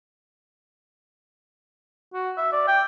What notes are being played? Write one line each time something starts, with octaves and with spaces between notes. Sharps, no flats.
F#4
E5
D5
G5